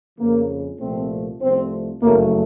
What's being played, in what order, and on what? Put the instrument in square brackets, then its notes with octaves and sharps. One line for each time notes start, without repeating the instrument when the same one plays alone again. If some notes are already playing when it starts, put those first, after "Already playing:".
[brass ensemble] F2 C#3 F3 A#3
C2 A#2 F3 A3 C4
C2 C3 F3 A3 C4
F#1 F2 C#3 F#3 A3 A#3